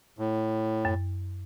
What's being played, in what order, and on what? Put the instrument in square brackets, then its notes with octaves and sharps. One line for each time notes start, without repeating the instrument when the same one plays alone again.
[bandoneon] A2
[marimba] F#2